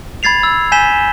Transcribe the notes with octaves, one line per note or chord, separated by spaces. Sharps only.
B5 G#6 A6 C7 F7
E6
G#5 G6 B6 E7 G7